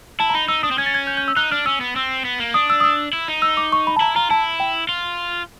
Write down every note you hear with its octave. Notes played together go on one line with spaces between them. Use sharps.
E4 A5
A#5
D#4 B5
D#4 E6
D4 D#6
C4
C#4 G#6
A6
G#6
G6
G6
E6
D#4 F#6
D4 F6
C#4 E6
B3
C4 E6
B3
A#3
D4 D#6
E6
D#6
E6
E4
D#4
E6
D6
C#6
B5
A5
E4 A#5
F4 A#5
E4 A5
G5
F4